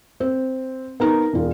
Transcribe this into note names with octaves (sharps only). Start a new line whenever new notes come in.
C4
B3 D#4 A#4
E1 F4